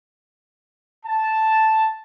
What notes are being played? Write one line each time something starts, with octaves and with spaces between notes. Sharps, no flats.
A5